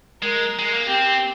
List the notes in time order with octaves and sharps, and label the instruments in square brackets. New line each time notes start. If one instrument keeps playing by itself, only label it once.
[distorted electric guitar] G#3 [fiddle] A#4
[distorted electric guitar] G#3
A#3
[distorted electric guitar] C4 [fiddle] G4